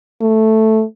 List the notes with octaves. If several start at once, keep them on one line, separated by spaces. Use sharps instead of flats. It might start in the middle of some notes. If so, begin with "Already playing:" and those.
A3